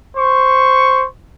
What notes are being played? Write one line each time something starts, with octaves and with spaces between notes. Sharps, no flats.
C5 C#6